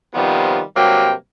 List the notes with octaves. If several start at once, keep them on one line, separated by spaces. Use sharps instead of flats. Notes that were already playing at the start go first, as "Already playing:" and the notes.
C3 D#3 F3 G3 B3 F4
G2 C3 F#3 A#3 G5